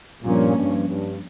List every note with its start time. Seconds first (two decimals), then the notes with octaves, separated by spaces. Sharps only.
0.23 G2 A#2 F3 A#3 C#4
0.57 G2
0.89 G2